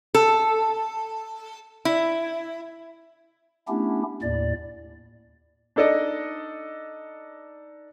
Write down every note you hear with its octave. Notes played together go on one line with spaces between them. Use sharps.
A4
E4
A3 B3 C#4 D4 E4 G4
D#2 A2 D5
D4 D#4 A4 D5 D#5